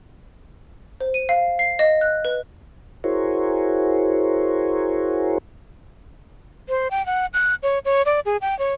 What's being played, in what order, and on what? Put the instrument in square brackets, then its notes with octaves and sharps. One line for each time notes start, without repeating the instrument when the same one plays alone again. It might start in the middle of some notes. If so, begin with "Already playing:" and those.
[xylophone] C5
D#7
F5
C7
D#5
F#6
B4
[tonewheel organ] E4 F#4 G#4 A#4 C5 C#5
[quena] C5
G5
F#5
F#6
C#5
C#5
D5
G#4
G5
C#5